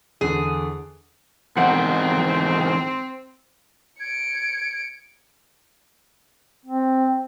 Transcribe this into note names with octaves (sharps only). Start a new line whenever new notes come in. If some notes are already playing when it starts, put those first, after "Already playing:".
E2 D3 G#4
E2 G#2 D#3 C4 F#5
G#6 C#7 D7
C4